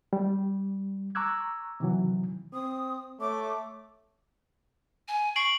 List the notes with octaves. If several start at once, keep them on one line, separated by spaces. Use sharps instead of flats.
G3
A#5 C#6 D6 E6 F#6 G#6
C3 D#3 E3 F#3
C4 D#6
A3 C#5 D6
G#5
C#6 C7 D7 F#7